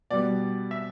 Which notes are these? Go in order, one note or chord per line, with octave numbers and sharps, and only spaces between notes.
B2 G3 B3 D5
E5